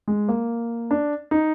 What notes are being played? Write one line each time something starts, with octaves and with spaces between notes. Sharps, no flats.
G#3
A#3
D4
D#4